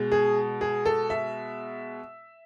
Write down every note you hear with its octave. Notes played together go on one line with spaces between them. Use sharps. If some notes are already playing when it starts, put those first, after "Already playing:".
Already playing: B2 G#3
G#4
G#4
A4
E5